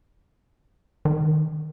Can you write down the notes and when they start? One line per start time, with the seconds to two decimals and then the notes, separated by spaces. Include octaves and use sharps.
1.05 D#3